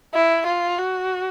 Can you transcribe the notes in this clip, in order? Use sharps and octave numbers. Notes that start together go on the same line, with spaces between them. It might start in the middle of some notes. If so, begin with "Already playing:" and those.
E4
F4
F#4